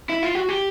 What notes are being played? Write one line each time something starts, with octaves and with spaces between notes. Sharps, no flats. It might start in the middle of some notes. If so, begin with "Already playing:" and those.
E4
F4
F#4
G4